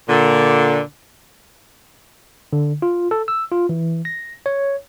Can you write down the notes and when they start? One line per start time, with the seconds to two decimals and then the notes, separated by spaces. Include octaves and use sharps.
0.09 A#2 D3
2.53 D3
2.82 F4
3.11 A4
3.28 E6
3.52 F4
3.69 E3
4.05 A#6
4.46 C#5